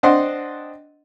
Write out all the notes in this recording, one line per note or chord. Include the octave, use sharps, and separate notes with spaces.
C4 D4 D#5 F#5 C6